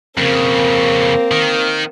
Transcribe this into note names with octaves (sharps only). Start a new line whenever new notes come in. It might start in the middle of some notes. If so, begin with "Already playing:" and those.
F2 C#3 A#3 C4
D#3